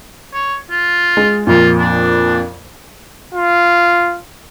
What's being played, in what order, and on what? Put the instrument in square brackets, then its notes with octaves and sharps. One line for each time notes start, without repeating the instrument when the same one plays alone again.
[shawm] C#5
F4
[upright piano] G#3
[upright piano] F2 A#2 [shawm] F4
[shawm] D4
[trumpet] F4